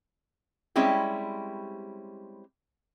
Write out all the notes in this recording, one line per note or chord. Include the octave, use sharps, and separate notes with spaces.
G3 G#3 C4 C#4 E4 G4